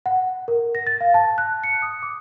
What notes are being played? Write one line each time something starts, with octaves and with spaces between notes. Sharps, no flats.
F#5
A#4
A#6
A6
F5
A5
F#6
C#7
D#6
D6